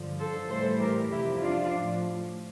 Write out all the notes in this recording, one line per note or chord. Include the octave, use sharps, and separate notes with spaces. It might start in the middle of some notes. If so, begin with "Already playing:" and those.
Already playing: G2 D3 F3
A4 C5
A2 E3 G3 A4 C5
G4 A#4
F2 C3 F3 E4 G4
D4 F4
A2 F3